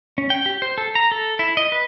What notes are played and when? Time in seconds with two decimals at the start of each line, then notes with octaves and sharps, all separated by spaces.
0.18 C#4
0.30 G5
0.46 G4
0.62 C5
0.78 A4
0.95 A#5
1.12 A4
1.39 E4
1.57 D#5
1.72 B4